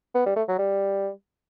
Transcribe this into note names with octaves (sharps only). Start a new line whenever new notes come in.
B3
G3
A3
F#3
G3